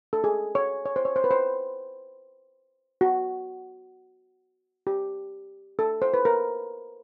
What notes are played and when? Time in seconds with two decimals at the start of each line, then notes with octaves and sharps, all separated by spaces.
0.13 A4
0.24 G#4
0.55 C#5
0.85 C#5
0.96 C5
1.05 C#5
1.16 C5
1.24 B4
1.31 C5
3.01 F#4
4.87 G4
5.79 A4
6.02 C5
6.14 B4
6.25 A#4